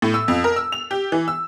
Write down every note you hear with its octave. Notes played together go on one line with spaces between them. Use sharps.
A2
E6
F2
A#4
E6
F7
G4
E3
E6